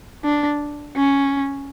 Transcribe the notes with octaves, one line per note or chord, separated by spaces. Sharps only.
D4
C#4